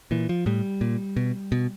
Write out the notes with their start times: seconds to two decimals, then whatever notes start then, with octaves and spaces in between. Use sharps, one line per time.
0.11 A#2 E3
0.29 F3
0.46 A2 G3
0.81 A#2
1.17 B2
1.52 B2